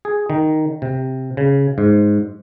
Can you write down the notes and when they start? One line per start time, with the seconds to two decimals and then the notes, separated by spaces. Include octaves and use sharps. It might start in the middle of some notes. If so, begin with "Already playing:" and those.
0.05 G#4
0.30 D#3
0.82 C3
1.37 C#3
1.78 G#2